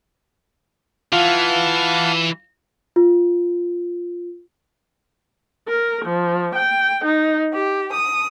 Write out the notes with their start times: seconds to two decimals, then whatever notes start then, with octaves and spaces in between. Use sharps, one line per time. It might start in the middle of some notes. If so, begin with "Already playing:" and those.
1.13 E3 F4 F5 F#5 A5
2.96 F4
5.70 A#4
6.05 F3
6.56 G5
7.05 D#4
7.52 G4
7.90 D#6